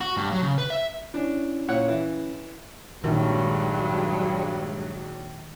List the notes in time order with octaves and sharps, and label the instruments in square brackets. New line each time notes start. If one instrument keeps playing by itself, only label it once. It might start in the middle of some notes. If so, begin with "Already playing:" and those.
[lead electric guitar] F#4
G2
F#3
C#3
B4
E5
[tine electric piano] C#4 E4 [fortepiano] D4
[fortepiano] A#2 C#5 F#5
E3
[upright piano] A#1 [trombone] G2 [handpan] D#3 F#4 A#4 [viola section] F#3 G#3